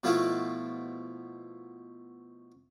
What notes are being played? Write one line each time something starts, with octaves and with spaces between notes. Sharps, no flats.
B2 F3 A3 E4 F4